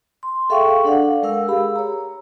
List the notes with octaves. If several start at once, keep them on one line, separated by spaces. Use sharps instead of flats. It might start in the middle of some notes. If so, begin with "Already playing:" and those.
C6
G#4 A4 E5 F5 G5 C#6
D4 A4 D5 F5 F#5
G#3 A#4 F5 E6
G4 G#4 B5
C#5 A#5